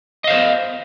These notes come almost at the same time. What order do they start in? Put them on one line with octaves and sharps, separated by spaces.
D#5 F5 C5